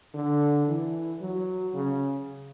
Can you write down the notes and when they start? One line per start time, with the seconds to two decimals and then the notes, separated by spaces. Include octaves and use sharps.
0.14 D3
0.67 E3
1.21 F#3
1.74 C#3